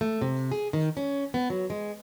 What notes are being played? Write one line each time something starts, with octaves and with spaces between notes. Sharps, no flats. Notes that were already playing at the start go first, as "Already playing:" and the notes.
A3
C3
G#4
D#3
C#4
B3
F#3
G#3